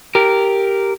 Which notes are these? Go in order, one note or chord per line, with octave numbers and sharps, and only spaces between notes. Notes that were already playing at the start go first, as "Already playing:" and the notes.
G4 A#4